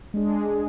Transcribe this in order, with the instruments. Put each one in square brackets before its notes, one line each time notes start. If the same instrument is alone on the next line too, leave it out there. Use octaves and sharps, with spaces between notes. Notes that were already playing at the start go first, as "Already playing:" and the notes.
[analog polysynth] G#3 D4 G#4